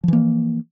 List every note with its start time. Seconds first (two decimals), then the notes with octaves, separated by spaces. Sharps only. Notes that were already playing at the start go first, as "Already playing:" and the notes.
0.04 F3
0.08 E3
0.13 A#3